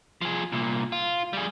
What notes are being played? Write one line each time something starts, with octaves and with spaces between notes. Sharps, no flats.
F3 G#4
C2 A#2
F4
G3 G#4